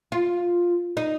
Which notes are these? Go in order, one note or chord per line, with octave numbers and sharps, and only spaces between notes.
F4
D#4